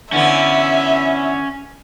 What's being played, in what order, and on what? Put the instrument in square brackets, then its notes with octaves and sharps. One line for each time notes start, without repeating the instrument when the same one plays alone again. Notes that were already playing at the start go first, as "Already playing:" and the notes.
[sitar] D3 E3 B3 [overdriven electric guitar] C#4 [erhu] E5